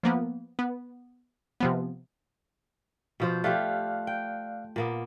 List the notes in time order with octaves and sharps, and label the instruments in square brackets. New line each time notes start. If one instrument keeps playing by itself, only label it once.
[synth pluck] F3 A#3 B3
B3
C3 F3 B3
[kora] B2 F3 C5
[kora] A3 F4 G4 [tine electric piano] D5 F5 F#6
[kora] G5
A#2 A#3 B3